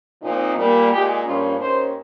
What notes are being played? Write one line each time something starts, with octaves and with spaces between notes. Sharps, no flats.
A#2 F3 C4 D#4
A#2 G3 A#3
A#2 G#3 D#4 G4
G2 F3 A#3 C#4 F4
D#2 D#3 A#3 C#4 C5